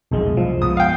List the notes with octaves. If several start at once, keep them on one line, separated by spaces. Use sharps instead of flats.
F1 B1 B2 F3 G#3
C2 G2 F3
G2 G#3 B3 D#6
F5 G5